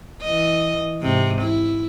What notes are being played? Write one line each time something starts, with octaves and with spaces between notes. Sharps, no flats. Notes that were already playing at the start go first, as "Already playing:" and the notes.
E3 D#5
G#2 C3
E4